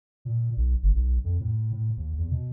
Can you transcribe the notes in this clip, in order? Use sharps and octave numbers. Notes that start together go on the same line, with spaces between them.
A#2
B1
G1
B1
F2
A2
A2
D#2
E2
B2